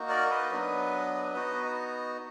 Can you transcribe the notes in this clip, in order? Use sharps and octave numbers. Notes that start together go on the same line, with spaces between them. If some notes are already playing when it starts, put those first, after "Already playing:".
Already playing: A#3 D#4 F#4
A#4 D5
B4 D#5
F#3 B3 D4
B3 D#4 F#4